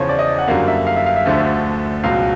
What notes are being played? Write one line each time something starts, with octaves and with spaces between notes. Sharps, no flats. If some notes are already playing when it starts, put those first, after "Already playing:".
Already playing: E2 C#3 F3 C5 C#5
D5
D#5
F#5
F#2 D3 G3 A#3 F5
E5
F5
E5
F5
E5
D2 D3 F3 A3
C#2 B2 F#3 F5